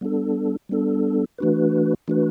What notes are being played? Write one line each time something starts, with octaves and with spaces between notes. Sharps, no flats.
G3 B3 D4 A4
G3 B3 D4 A4
E3 A3 D4 F#4 B4
E3 A3 D4 F#4 B4